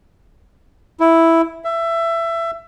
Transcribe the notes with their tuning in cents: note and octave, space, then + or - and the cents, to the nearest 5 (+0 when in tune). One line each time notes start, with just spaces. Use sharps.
E4 +0
E5 +20